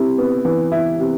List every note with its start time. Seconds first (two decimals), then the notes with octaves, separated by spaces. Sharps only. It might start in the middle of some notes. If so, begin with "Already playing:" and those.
Already playing: C3 E4
0.18 B3
0.45 E3
0.72 E4
0.99 C3